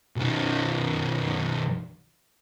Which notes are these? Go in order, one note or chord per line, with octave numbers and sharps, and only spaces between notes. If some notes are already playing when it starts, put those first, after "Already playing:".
B1 D#3